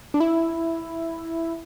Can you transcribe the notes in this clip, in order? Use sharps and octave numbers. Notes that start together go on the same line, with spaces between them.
D4
E4